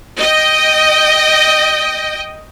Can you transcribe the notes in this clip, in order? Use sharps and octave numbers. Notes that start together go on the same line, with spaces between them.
D#5 G5